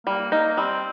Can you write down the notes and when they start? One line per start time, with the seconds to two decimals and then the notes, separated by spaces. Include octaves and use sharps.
0.07 G3 A#3
0.32 A#3 D#4
0.57 G3 C4